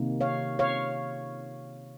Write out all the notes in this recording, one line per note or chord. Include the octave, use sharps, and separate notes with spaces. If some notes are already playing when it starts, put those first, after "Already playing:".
Already playing: C3 D#3 A#3
C#5 F5
C#5 F5